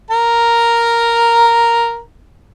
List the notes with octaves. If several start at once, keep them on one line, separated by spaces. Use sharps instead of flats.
A#4 A#5